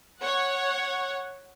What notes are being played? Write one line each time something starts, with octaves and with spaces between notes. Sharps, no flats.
C#5 F#5